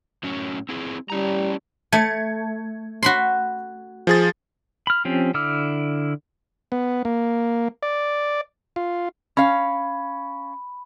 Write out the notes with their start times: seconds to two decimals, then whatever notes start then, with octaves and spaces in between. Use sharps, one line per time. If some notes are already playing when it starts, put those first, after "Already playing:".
0.23 A2 F#3 C#4
0.69 C4 E4 G#4
1.10 G3 C#4 E4 A#5
1.93 A3 G#6 C#7
3.03 F#4 B5 C6
4.07 F3 G#4 A6
4.87 B5 F6
5.05 F3 C4 C#4 G4
5.34 D3 E4 D6 E6 F6
6.72 B3
7.05 A#3
7.83 D5
8.76 F4
9.37 C#4 F5 B5